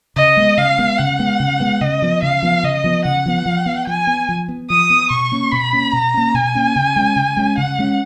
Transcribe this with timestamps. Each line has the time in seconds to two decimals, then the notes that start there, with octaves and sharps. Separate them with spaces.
0.16 C#3 D#5
0.37 G#3 B3
0.58 C#3 F5
0.78 G#3 B3
0.99 C#3 F#5
1.19 G#3 B3
1.40 C#3
1.60 G#3 B3
1.81 C#3 D#5
2.02 F3 B3
2.22 C#3 F5
2.43 F3 B3
2.63 C#3 D#5
2.84 F3 B3
3.05 C#3 F#5
3.26 F3 B3
3.46 F3
3.66 B3
3.87 F3 G#5
4.07 B3
4.29 F3
4.49 B3
4.69 F3 D#6
4.90 B3
5.10 B2 C#6
5.32 A#3 C#4
5.51 B2 B5
5.73 A#3 C#4
5.93 B2 A#5
6.14 A#3 C#4
6.34 B2 G#5
6.55 A#3 C#4
6.76 C#3
6.96 G#3 C#4
7.16 C#3
7.37 G#3 C#4
7.58 C#3 F#5
7.79 G#3 C#4